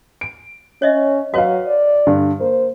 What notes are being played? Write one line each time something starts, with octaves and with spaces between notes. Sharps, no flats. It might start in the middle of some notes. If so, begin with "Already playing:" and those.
D7
C#4 C#5 D#5 E5
F#3 F#4 B4 C#5 D#5 F5
D5
G2 D3
A#3 C5